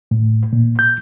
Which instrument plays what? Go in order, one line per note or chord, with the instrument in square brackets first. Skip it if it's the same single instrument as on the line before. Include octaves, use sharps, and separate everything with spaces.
[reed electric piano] A2
A#2
G6